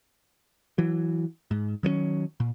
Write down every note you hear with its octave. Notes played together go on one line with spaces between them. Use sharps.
E3 F#3
G#2
D#3 F#3 G#3 C#4
A#2